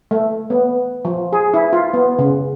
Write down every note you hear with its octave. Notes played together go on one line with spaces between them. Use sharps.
A3
B3
F3
G#4
E4
F4
B3
C#3